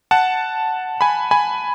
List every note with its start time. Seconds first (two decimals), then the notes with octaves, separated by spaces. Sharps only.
0.11 F#5 A5
1.01 G#5 B5
1.31 G#5 B5